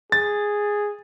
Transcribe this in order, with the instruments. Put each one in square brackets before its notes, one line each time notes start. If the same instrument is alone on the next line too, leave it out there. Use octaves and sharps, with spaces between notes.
[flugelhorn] G#4 [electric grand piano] A6